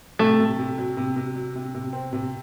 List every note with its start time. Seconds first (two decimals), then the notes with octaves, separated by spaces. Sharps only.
0.19 C3 A3
0.39 C3
0.59 C3
0.78 F#3
0.97 C3
1.16 C3
1.36 F#3
1.55 C3
1.74 C3
1.93 C4
2.13 C3